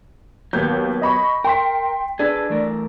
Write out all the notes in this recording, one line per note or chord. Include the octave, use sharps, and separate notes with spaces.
D#2 F#3 B3 G6
D#5 B5 C#6
A#4 G5 C6 B6
D4 G#4 A4 B4
E3 A3 A#4